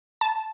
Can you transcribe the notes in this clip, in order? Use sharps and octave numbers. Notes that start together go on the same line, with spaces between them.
A5